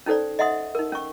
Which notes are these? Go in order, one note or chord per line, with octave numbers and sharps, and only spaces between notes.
C#4 D#4 A4 C5 D5
D#5 E5 F#5 C6 D#6
D#4 A#4
C#4 C#6